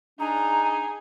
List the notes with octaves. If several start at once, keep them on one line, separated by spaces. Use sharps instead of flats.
D4 D#4 G#4 A#5